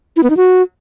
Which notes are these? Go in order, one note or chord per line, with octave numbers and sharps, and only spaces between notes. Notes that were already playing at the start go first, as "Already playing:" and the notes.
E4
B3
D#4
F#4